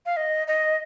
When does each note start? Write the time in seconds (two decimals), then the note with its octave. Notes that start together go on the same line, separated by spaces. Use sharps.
0.06 F5
0.17 D#5
0.48 D#5